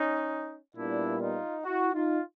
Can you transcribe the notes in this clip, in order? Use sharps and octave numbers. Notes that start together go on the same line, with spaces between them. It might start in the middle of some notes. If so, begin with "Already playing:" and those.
Already playing: C#4 D#4
A#2 G3 B3 D4 E4
D#4 F4
E4 F#4
D#4 F4